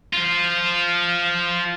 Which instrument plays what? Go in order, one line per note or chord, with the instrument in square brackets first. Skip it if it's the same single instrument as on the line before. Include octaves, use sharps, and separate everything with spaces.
[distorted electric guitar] F4 C5